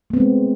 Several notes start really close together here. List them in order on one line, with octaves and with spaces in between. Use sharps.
A3 B3 C4 G#3